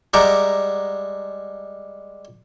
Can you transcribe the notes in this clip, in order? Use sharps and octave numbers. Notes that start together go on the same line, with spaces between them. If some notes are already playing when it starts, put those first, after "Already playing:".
G3 G#3 E5 F#5 A#5 D6